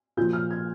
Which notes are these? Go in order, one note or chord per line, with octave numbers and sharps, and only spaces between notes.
A#2 F3 G6
F6
G#6